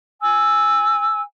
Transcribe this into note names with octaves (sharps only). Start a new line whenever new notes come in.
G#5 E6